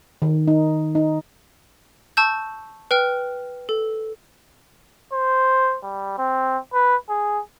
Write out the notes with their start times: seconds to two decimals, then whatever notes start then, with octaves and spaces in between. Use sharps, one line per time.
0.22 D#3
0.48 D#4
0.95 D#4
2.17 A5 C#6 E6 G6
2.91 B4 G5 F6
3.69 A4
5.13 C5
5.84 G3
6.18 C4
6.74 B4
7.10 G#4